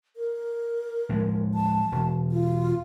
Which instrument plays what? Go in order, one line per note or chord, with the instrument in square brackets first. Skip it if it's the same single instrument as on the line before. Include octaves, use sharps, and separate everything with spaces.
[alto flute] A#4
[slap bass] A2 F3 G#3
[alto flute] A5
[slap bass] E1
[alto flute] F4